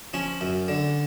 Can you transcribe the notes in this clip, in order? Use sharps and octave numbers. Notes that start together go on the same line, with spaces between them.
F3 C#4
F#2
D3